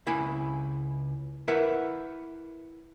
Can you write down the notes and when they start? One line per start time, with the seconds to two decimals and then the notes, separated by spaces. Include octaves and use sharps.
0.07 C#2 E4 G#5 B5
1.48 E4 A#4 B4 E5 F#5